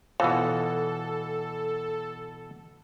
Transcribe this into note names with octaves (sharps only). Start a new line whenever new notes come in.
B2 E3 F3 B3 F#4 A4